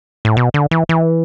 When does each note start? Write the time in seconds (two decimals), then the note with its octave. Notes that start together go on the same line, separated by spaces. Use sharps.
0.25 A2
0.37 B2
0.54 D3
0.71 E3
0.89 E3